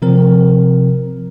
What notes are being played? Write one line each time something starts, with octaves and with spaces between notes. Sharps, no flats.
C3 F3 C4 A#4